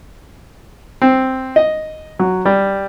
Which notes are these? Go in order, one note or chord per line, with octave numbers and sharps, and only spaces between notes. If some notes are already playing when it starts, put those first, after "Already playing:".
C4
D#5
F#3
G3